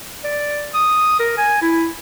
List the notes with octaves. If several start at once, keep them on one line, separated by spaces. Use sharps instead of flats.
D5
D#6
A#4
G#5
E4